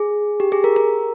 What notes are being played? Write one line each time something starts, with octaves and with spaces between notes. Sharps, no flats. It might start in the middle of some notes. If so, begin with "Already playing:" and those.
Already playing: G#4
G4
G#4
A#4
A#4